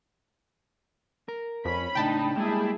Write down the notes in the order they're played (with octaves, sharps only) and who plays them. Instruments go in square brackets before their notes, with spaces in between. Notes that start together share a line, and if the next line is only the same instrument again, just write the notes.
[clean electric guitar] A#4
[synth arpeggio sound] F2 [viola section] C#4 B5
[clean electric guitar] C#2 A2 D4 [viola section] D#4 [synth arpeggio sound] G5 A5 B5
[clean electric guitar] G3 G#3 A#3 [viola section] E4 G#4